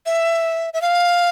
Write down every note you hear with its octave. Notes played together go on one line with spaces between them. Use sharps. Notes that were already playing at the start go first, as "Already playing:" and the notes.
E5
E5
F5